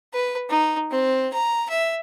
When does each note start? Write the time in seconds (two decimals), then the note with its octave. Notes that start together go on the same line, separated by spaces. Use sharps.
0.13 B4
0.50 D#4
0.91 C4
1.33 A#5
1.69 E5